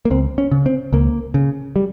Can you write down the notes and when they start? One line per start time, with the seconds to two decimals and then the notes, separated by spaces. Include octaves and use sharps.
0.05 A#3
0.10 C#2 C4
0.38 C#4
0.51 C#3
0.66 C4
0.93 C#2 A#3
1.34 C#3
1.76 G3